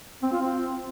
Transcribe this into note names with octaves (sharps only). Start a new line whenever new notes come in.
C4
F4
C4